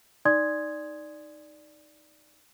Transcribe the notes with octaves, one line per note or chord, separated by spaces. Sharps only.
D#4 D5 G#5 C6 D#6 G#6